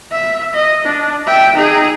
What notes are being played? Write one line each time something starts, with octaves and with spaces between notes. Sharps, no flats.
E5
D#5
D4
E5 G5
D#4 G#4